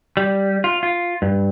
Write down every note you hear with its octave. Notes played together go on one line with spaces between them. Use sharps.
G3
F4
F4
G2